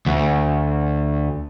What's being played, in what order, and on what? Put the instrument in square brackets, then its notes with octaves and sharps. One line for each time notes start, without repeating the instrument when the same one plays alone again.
[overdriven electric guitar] D2